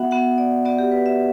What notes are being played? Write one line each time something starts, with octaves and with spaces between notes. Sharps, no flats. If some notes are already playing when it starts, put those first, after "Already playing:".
Already playing: B3 F#4 E5 F#5
B3 F#4 F#5
D5
B3 F#4 D5
G4
B4
E5